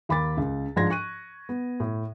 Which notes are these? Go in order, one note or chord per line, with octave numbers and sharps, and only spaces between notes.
D#2 B5 D6 A6
C#2
G#2 F3 D4 C6 G#6 A#6
C#6 F#6 D#7
B3
A2